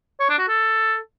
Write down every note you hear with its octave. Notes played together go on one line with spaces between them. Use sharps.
C#5
D4
F#4
A4